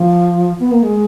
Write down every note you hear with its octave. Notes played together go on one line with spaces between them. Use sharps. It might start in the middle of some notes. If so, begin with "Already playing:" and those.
Already playing: F3
B3
A#3
G#3